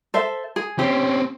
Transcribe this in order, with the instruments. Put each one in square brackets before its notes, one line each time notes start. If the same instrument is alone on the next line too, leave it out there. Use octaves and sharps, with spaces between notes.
[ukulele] A4 C5 E5
G#4
[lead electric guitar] C4 C#4 [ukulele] G4